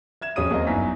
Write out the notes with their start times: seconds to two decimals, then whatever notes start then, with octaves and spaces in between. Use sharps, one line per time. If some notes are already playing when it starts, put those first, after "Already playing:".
0.21 E5 G#6 E7
0.36 D#1 F2 C#4 G#4 D#6 D#7
0.50 D#2 F#3 A#3 C4 D#5
0.67 G1 F#2 D#4 E4 B6